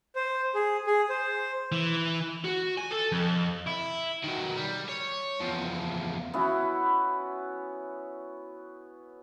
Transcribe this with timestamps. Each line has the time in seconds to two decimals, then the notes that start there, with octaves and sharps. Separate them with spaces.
0.16 C5
0.55 G#4
0.87 G#4
1.10 C5
1.72 E3
2.44 F#4
2.77 G#5
2.91 A4
3.12 F2
3.67 E4
4.24 D#3 F#3
4.56 G3
4.89 C#5
5.41 E2 F3
6.34 B3 C#4 E4 F#4